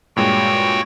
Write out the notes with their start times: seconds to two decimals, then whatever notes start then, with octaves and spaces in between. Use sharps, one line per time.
0.16 G2 A#2 G#3 F#4 C#5 G5